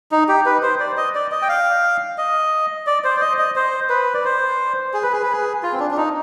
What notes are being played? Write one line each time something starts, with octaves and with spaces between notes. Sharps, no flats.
D#4
G4
B4
C5
D5
D#5
D5
D#5
G5
F5
D#5
D5
C5
D5
D#5
D#5
C5
B4
D5
C5
G#4
B4
G#4
B4
G#4
F4
C4
D4
D4
D#4